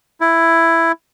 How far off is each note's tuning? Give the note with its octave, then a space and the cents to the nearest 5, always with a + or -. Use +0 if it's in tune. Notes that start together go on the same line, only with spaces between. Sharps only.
E4 +5